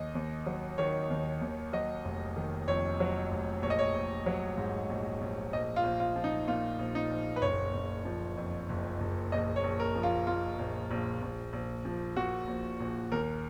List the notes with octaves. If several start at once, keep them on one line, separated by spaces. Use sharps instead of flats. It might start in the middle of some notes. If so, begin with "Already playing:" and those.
Already playing: D#2 D#5
D#2
F#3
D#3 C#5
D#2
D#2
F#3 D#5
F1
D#3
F2 C#5
F#3
F1
A#1 C#5
D#5
C#5
A#1
F#3
G#2
A#1
A#1
A#1 D#5
F4
A#1
F4
F3
D#4
A#2 F4
A#1
D#4
A#1
B4
F#1 C#5
F#1
F3
F2
F#1
F#1
A#1 D#5
C#5
A#1
A#4
F3
F4
A#2 F4
A#1
A#1
A#1
A#1
F3
A#2 F#4
A#1
A#1
D#2 A#4